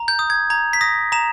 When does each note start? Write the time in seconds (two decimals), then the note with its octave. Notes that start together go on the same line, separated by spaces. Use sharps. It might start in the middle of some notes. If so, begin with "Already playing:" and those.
Already playing: A#5
0.08 G6
0.19 D#6
0.30 G#6
0.50 A#5 G#6
0.73 B6
0.81 D#6 A#6
1.12 A#5 E7